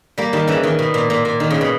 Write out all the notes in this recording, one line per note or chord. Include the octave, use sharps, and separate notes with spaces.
G3 A#3
D#3 G3
C#3 E3
D#3
B2
A#2
A#2
A#2
D#3
C#3
B2